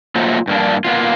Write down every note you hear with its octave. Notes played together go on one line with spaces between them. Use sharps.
F#3 A3 A#3 D#4 F4 C5
G2 A#3 D4
A#3 B3 F4